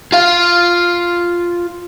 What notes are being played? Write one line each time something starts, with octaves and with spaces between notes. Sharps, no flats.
F4 F5